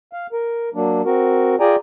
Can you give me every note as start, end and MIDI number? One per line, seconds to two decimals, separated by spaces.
0.13 0.27 77
0.33 0.69 70
0.75 1.02 54
0.75 1.02 58
0.75 1.02 62
1.05 1.55 60
1.05 1.55 66
1.05 1.55 70
1.60 1.76 65
1.60 1.76 68
1.60 1.76 74
1.60 1.76 79
1.60 1.76 80
1.60 1.76 82